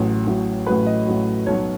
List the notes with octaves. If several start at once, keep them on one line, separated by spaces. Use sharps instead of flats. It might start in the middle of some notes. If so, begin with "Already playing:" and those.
Already playing: A1 A2 F#3
A1 A2 F#3
A1 A2 F#3 B4
D#5
A1 A2 F#3
B1 B2 F#3 C#5